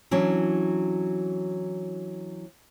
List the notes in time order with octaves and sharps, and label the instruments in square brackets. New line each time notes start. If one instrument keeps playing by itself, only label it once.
[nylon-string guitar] E3 F#3 C#4 D4